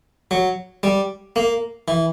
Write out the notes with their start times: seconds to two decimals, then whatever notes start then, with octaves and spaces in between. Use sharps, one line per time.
0.31 F#3
0.83 G3
1.36 A#3
1.88 E3